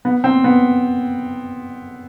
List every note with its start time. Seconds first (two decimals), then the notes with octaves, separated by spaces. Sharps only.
0.05 B3
0.24 C4
0.44 B3